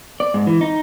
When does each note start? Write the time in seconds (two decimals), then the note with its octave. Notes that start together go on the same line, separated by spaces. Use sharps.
0.20 D5
0.34 G#2
0.47 E3
0.61 D#4